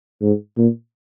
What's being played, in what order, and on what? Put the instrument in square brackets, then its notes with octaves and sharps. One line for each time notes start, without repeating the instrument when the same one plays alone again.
[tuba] G#2
A#2